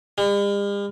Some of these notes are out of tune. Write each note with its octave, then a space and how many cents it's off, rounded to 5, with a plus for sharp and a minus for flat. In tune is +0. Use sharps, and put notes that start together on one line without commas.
G3 +45